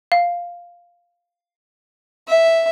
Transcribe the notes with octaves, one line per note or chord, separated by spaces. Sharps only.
F5
E5